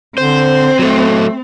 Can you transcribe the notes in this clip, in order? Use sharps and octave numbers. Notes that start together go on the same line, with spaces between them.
D3 C4 C5
F#3 A3 A4